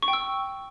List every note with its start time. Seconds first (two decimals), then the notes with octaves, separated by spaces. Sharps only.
0.02 C#6
0.08 G5
0.13 E6